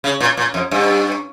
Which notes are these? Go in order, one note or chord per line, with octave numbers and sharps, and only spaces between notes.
C#3
A#2
A#2
F2
G2